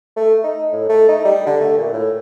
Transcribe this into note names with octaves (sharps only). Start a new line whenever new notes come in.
A3
D#4
A2
A3
D#4
G3
D3
A3
A#2
A2